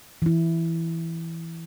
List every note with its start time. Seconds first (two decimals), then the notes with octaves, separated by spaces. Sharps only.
0.22 E3 E4